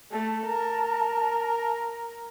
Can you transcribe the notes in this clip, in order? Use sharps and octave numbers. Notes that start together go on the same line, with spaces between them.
A3 A5
A#4